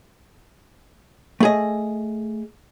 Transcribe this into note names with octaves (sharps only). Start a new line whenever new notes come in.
A3 G#4 D#5